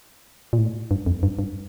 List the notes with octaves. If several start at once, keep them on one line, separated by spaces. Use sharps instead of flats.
A#2
A2
G2
F2
G2
G2